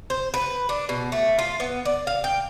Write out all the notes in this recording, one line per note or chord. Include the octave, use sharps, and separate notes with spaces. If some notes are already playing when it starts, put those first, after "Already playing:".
C5
B4
D4
B2
A3
F4
B3
D5
F5
G5